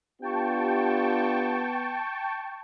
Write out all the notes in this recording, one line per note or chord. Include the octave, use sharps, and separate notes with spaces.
B3 D4 F4 G4 G5 A5 C#6